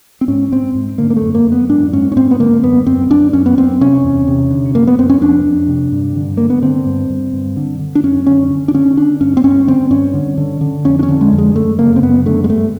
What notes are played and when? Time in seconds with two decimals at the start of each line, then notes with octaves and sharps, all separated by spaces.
0.21 C4
0.28 G#2 C#4
0.52 G#2 C4
0.75 G#2
0.98 D3 A#3
1.10 A#3
1.17 A3
1.22 F#2
1.35 A#3
1.46 F#2
1.52 B3
1.69 G#2 D4
1.92 G#2 C#4
2.12 C#4
2.16 G#2 C4
2.31 B3
2.39 D3 A#3
2.63 F#2 B3
2.86 F#2 C4
3.10 F#2 D4
3.33 F#2 C#4
3.46 B3
3.57 F#2 C4
3.81 C3 C#4
4.03 E2
4.27 C3
4.51 D3
4.74 F#2 A#3
4.87 B3
4.98 F#2 C4
5.10 C#4
5.21 F2 D4
5.45 F2
5.68 C3
5.92 G2
6.16 D3
6.37 D3 A#3
6.50 B3
6.62 D3 C4
6.86 G2
7.10 G2
7.33 G2
7.57 D3
7.79 D3
7.95 D4
8.03 F#2 C#4
8.26 D3 C#4
8.50 D3
8.68 D4
8.74 D3 C#4
8.97 D3 D4
9.21 G2 C#4
9.37 C4
9.44 G2 C#4
9.67 D3 C4
9.90 G2 C#4
10.14 D3
10.38 D3
10.61 D3
10.85 F2 C#4
10.99 D4
11.03 C#4
11.08 D3
11.21 G#3
11.33 F2
11.38 G#3
11.55 F#2 A3
11.79 C#3 A#3
11.96 C4
12.02 F#2 B3
12.26 D3 A3
12.44 G#3
12.49 G2 A3